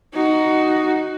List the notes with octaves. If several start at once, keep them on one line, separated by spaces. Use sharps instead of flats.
D#4 F#4